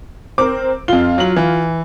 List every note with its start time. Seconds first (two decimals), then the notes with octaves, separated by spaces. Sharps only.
0.38 C4 A#4 D6
0.88 F2 F4 G7
1.18 F#3 F#7
1.36 E3